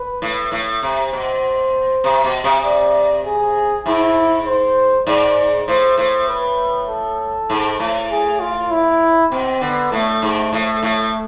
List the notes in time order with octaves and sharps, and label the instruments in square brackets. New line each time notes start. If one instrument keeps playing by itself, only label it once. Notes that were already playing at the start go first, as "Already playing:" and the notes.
Already playing: [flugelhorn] B4
[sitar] A2
A2
C3
[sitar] B2 [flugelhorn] C5
[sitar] C3
B2
C3
[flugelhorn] D5
G#4
[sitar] G#2 [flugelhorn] E4
[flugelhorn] C5
[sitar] G#2 [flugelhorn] D5
[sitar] A2 [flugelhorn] C5
[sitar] A2 [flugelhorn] C5
[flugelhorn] B4
A4
[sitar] G#2
A2
[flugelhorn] G#4
F4
E4
[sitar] B2 [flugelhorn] C4
[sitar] D3 [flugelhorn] B3
[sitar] A2 [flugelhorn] A3
[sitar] G#2
A2
A2